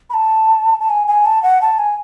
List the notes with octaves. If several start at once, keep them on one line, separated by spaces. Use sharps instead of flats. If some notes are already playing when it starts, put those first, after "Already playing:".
B5
A5
A5
G#5
G#5
A5
F#5
A5
G#5